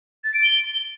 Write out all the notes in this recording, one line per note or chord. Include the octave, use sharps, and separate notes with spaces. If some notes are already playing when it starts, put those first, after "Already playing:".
A6
D7
G7